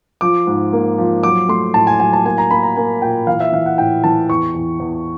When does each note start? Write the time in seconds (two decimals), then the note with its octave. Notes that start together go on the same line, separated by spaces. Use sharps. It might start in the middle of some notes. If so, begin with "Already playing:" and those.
0.21 F3 D6
0.47 G#2
0.73 A#3
0.98 F3
1.23 F#3 D6
1.48 A3 C6
1.74 A2 A5
1.87 G#5
2.00 F#3 G#5
2.13 A5
2.25 A#3 G#5
2.38 A#5
2.51 A#3 B5
2.63 A#5
2.76 A#3 G#5
3.02 A#2 G5
3.27 E3 F5
3.40 E5
3.52 E3 F5
3.66 F#5
3.78 A2 G5
4.04 E3 A5
4.29 E2 C#6
4.55 E2
4.80 E2